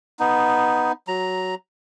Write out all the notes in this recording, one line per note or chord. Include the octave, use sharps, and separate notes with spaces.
B3 D#4
F#3 A#5